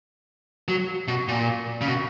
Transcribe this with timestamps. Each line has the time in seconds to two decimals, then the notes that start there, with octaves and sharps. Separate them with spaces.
0.68 F#3
1.08 B2
1.28 A#2
1.81 C#3
1.88 B2